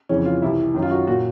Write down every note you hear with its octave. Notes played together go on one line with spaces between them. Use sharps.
F2 C#3 E3 C#4
F4
C2 C3 E3 E4
F#2 D#3
F4
F#4
A#2 F#4